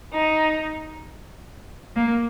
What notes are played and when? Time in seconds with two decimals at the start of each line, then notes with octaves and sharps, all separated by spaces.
0.12 D#4
1.95 A#3